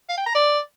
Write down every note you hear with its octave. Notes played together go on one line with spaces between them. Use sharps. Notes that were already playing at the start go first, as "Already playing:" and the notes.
F5
G5
A#5
D5